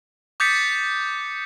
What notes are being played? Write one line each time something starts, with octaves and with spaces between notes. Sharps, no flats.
D6 D#6 G6 A6 B6 C#7